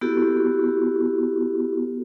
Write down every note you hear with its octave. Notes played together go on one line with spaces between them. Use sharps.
B3 E4 F#4 G4 A4